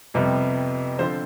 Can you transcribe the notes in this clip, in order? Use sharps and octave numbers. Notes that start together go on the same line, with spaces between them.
F2 C3 G3 B3
D3 F3 C4 F4 C5